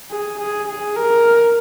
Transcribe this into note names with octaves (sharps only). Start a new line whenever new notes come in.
G#4
G#4
G#4
A#4